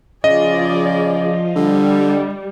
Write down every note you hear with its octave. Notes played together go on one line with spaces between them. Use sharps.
C#3 F3 F4 G#4 D5 D#5
D3 G3